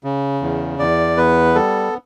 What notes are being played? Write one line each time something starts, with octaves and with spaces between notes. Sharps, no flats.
C#3
E2
E2 D5
B3 B4
G3 A4